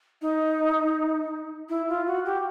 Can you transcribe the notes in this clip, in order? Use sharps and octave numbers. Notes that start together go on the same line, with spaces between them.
D#4
E4
F4
F#4
G4